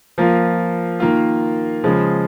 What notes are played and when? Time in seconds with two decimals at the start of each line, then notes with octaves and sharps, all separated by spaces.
0.18 F3 A#3 F4
1.00 D#3 A#3 F4
1.84 C#3 F3 G#3